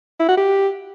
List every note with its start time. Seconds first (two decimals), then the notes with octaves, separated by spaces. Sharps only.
0.20 E4
0.28 F#4
0.37 G4